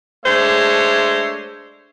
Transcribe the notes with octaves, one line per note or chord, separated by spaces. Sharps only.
G#3 A3 D4 C5 C#5 E5